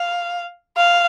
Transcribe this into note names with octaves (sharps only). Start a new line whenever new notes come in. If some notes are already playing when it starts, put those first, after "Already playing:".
Already playing: F5
F5